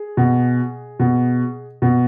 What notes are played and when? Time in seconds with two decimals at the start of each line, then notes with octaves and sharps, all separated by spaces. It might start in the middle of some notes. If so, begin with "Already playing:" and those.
Already playing: G#4
0.17 B2
0.99 B2
1.82 B2